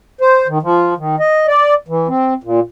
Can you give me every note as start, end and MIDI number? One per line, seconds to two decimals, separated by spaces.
0.21 0.47 72
0.47 0.58 51
0.62 0.94 53
0.98 1.16 51
1.19 1.46 75
1.48 1.74 74
1.88 2.08 52
2.08 2.34 60
2.44 2.60 46